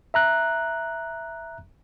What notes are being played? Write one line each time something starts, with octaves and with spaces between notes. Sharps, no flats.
E5 A#5 F#6